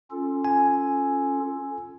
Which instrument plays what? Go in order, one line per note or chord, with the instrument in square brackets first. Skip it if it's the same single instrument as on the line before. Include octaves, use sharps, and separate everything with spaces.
[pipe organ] C#4 F4 A4
[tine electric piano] G#5